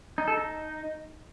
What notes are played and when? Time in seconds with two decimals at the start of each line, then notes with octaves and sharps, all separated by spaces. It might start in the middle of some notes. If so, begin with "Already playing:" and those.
0.18 D#4
0.28 A4
0.37 D#4